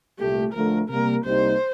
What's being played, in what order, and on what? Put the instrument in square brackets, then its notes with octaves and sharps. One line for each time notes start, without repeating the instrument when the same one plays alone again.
[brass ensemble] C2 A#2 A3 [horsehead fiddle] G4
[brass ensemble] D2 D3 F3 A3 [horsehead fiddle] A#4
[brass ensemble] C3 G3 A#3 [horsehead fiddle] A#4
[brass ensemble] C2 C3 G3 A#3 D#4 [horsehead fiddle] C5